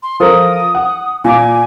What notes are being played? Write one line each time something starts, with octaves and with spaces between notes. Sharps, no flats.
C6
F3 A4 A#4 D#6
F#5
A#2 G#5 D6